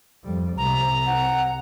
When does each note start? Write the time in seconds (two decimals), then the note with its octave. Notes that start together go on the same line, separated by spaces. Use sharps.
0.24 F2 G3
0.58 C2 C3 A#5
1.06 F#5